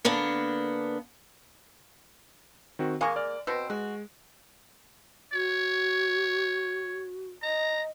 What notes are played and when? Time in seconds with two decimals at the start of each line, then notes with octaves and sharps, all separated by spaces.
0.05 D3 A#3 B3 D4
2.79 D#3 C4 F#4
3.01 G#3 A#3 F5 G#5 C#6
3.16 D5 F6
3.47 B2 C4 E6
3.70 G#3 F#4
5.33 F#4 C#5
7.43 D#5 A#5